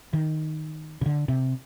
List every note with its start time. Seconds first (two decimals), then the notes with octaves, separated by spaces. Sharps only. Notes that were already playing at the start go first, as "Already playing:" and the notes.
0.13 D#3
1.01 C#3
1.06 D3
1.28 C3